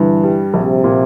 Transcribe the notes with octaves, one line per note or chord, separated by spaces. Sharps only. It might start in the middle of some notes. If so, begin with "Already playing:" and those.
Already playing: G2 D3 E3
G3
A#1 C3
A#2